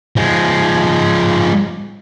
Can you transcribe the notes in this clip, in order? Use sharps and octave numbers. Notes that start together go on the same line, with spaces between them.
F3 G#3